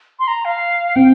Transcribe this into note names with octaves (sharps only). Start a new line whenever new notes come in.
C6
A#5
F5
C4 G5